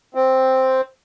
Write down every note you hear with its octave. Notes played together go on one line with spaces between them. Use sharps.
C4